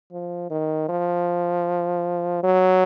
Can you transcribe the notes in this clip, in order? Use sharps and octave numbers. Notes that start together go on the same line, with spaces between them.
F3
D#3
F3
F#3